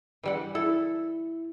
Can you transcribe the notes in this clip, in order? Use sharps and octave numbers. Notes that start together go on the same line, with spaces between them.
E3 G3 F#5
E4 A4